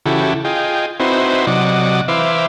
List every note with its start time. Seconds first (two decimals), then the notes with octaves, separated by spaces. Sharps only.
0.06 C#3 E3 E4 F#4 G4 A4
0.45 F4 G#4 D#5 G5
1.00 C4 D#4 E4 F#4 B4 C5
1.47 C3 F#3 D5 D#5 F#5
2.08 E3 B4 C5 E5 F5 D6